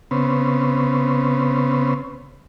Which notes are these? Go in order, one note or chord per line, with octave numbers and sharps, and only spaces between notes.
C#3 B3 C4